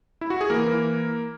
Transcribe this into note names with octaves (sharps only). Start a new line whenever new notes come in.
E4
F#4
G#4
E3 A#3 A#4
E3